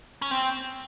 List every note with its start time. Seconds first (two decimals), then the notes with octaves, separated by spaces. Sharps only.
0.22 C#4
0.31 C4